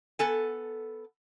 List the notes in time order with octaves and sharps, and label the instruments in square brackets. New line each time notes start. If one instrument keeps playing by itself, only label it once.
[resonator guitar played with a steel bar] B3 A4 G#5